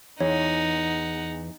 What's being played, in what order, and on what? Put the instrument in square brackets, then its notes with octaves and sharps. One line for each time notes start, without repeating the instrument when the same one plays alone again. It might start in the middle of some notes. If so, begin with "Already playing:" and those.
[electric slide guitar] E2 [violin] D#4 F#5 [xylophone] C#5